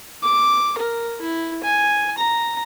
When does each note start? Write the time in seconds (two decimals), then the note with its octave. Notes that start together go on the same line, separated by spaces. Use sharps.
0.23 D6
0.78 A#4
1.21 E4
1.64 G#5
2.18 A#5